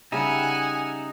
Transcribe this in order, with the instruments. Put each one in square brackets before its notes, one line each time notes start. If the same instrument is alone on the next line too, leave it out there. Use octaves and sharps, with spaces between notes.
[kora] C#3 G3 [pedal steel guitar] D#4 E5 [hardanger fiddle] F#5 G#5